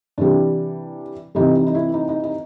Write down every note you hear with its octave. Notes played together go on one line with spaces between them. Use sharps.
C3 E3 G3 D4
C3 E3 G3 D#4
D#4
D#4
E4
D#4
D#4
D#4